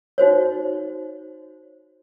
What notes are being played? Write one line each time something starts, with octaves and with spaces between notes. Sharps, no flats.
D#4 F#4 C5 C#5